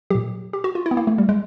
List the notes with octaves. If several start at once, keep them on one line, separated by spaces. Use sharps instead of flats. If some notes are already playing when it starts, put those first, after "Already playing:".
A#2 F#3 G4
G4
F#4
F4
E4
B3
A#3
A3
G3
G#3